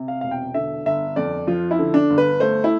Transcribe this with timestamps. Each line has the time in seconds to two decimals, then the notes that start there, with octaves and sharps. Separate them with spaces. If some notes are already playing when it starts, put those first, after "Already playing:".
Already playing: C3
0.08 F5
0.21 E1 F5
0.31 G5
0.54 D3 E5
0.86 G1 E5
1.16 F2 D5
1.47 F3 F4
1.71 E4
1.79 D3
1.94 D4
2.10 G1
2.18 B4
2.40 A3 C5
2.64 E4